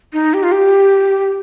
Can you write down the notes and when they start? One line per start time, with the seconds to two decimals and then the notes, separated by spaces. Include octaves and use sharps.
0.13 D#4
0.34 G4
0.43 F4
0.52 G4